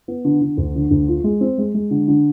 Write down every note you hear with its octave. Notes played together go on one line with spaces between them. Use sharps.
B3
D3
D3
D2
D3
D2
F4
G#3
C4
G#3
G#3
D3
D3